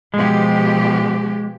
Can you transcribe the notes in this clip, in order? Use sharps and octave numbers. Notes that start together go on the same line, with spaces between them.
B2 F3 G#3 G4